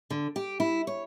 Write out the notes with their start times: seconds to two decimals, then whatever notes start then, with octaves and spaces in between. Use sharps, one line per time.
0.10 D3
0.36 G4
0.60 E4
0.87 C#5